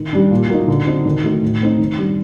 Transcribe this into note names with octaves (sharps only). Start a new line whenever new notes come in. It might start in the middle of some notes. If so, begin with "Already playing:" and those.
Already playing: D#3
G3 D4
A#2
F#3 A#3 D#4
D3
F#3 C4 D#4
D#3
F#3 A3 D#4
A2
A3 C4 D#4
D#3
G3 D4